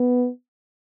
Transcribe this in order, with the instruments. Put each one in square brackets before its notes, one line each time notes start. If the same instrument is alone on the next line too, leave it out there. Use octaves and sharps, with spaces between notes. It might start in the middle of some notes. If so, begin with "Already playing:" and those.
Already playing: [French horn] B3